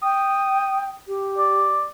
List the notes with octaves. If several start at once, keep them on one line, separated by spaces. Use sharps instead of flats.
G5 D#6
G4
D5